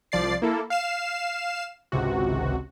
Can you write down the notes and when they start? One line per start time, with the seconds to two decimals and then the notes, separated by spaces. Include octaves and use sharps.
0.12 C2 F3 D5 A6 C7
0.42 A#3 E4 A4
0.70 F5 C7 E7
1.92 G#1 C#2 C3 F#4